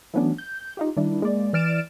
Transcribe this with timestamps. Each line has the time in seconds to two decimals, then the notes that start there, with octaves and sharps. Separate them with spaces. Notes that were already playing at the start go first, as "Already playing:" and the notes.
0.14 E3 F#3 A3 B3 C#4 D4
0.38 G6
0.77 D#4 F4 G4
0.97 D#3 G3 D4 E4
1.22 G#3 A#3 D5
1.53 E3 D5 F6 A6 D7 E7